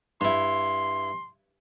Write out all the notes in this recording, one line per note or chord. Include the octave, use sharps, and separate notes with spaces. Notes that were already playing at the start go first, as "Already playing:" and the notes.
G2 E4 C6